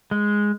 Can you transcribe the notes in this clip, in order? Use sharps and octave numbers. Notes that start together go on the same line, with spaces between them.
G#3